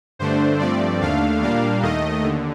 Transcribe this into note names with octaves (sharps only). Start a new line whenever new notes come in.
G2 D3 A3 D4 C5
G2 F3 A3 C4 D5
D#2 D3 A3 D4 F5
A#2 G3 A#3 D4 F5
D#2 D#3 A3 D#5
D#2 D3